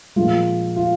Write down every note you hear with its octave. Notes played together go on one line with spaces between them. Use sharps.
A#2 F3 G#3 F4
F4